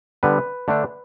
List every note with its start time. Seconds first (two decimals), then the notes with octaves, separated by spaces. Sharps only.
0.23 D3 G3 B3 B4
0.68 D3 A3 D4